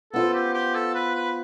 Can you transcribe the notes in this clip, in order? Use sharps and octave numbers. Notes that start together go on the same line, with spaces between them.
B3 F4 A4 C5
G4
G4
A4
B4
B4